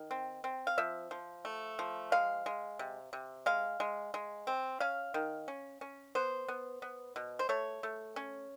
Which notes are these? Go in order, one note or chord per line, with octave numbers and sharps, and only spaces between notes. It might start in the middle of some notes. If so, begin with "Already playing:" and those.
Already playing: D#3
C4
C4
F5
F3 E5
F3
A3
F3
G#3 F5
G#3
C3
C3
G#3 F5
G#3
G#3
C4
C#4 F5
D#3
C#4
C#4
B3 C5
B3
B3
B2
C5
A3 C#5
A3
C#4